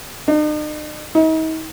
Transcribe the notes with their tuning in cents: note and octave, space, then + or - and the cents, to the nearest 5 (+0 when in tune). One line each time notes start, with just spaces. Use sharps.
D#4 -45
D#4 +40